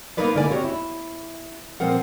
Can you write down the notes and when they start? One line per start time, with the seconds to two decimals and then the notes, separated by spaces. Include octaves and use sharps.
0.17 A#3 B3 D#4 A#4 B4 D5
0.36 D3 A#3 E4 A#4 D5 G#5
0.50 C4 F#4 G4 C#5
0.64 E4
1.80 A#2 F3 C4 A#4 F#5